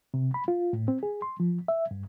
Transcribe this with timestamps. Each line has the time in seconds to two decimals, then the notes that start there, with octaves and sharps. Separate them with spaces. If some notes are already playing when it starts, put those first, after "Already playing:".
0.14 C3
0.34 B5
0.48 F4
0.73 A2
0.88 C4
1.03 G#4
1.22 C6
1.40 F3
1.68 E5
1.91 G2